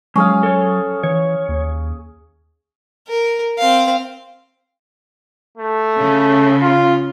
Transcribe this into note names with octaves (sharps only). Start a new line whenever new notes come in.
F#3 G#3 C#4 G#4 F5
A4 C#5
E3 C#5
D#2
A#4
C4 F5
A3
C#3
F4